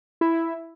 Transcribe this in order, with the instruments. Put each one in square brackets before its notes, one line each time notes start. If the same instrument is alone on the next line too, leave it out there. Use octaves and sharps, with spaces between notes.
[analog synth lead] E4